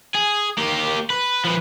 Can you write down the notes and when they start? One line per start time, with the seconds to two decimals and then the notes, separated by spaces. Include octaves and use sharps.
0.15 G#4
0.58 A#3 G4
1.10 B4
1.45 F3 B4